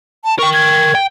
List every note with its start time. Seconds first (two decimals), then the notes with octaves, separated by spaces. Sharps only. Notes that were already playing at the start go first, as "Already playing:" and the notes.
0.25 A5
0.39 A#4 G5 C#6
0.54 G#6
0.95 G5